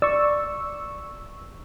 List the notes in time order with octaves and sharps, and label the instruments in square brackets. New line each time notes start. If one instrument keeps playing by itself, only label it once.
[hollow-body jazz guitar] D5 [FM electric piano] C#6 E6